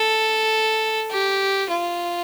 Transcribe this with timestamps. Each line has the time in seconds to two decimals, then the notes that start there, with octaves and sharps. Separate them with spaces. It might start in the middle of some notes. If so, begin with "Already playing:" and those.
Already playing: A4
1.11 G4
1.70 F4